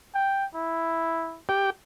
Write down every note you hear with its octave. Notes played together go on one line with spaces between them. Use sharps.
G5
E4
G4 G5